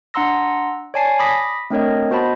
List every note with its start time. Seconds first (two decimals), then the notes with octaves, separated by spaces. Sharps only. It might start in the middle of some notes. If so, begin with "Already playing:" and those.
0.14 D4 F#5 A#5 C6 E6 A#6
0.94 C#5 D5 G#5 A5 C7
1.19 B5 D6 D#6 A#6 B6
1.70 A3 C4 D4 A#4 C#5 D#5
2.10 B3 F#4 C5 D#5 A5 B5